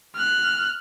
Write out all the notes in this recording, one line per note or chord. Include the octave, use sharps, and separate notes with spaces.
F6 F#6